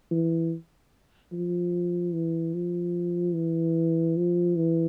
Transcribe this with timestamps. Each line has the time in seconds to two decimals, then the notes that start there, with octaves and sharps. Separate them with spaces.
0.11 E3
1.32 F3
2.13 E3
2.54 F3
3.35 E3
4.17 F3
4.56 E3